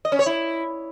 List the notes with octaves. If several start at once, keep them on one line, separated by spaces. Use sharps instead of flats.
D#5
C#4
C#5
E4